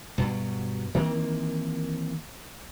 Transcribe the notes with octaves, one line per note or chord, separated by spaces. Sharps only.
G2 B2 F#3
D#3 E3 A#3 C4